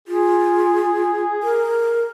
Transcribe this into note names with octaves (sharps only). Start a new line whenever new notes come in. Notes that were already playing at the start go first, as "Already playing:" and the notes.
F4 G#4
A#4